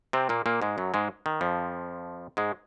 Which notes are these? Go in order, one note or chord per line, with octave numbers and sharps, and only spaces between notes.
C3 C4
A#2 A#3
A#2 A#3
G#2 G#3
F#2 F#3
G#2 G#3
D#3
F2 F3
G#2 G#3